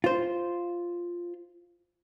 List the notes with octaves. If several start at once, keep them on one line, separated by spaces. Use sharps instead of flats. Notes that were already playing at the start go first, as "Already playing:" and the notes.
F4 C5